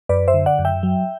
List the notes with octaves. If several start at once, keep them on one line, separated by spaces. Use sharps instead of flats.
F#2 B4 D5
C5 E5
D3
D5 F#5
F#2
E5 G5
F#3